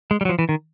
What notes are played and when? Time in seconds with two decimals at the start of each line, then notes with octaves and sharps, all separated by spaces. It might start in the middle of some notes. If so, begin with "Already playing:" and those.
0.11 G#3
0.21 G3
0.25 F#3
0.29 F3
0.39 E3
0.49 D#3